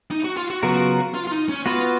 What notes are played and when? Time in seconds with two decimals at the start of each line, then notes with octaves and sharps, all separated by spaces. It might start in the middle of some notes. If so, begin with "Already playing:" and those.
0.11 D#4
0.24 F#4
0.37 F4
0.50 F#4
0.63 C#3 F#3 B3 F4 F#4 A#4
1.14 F4
1.27 F4
1.32 D#4
1.49 C#4
1.66 B3 F4 F#4 B4